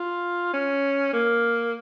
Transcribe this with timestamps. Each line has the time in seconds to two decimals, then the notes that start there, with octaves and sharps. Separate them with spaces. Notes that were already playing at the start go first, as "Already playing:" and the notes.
Already playing: F4
0.54 C#4
1.13 A#3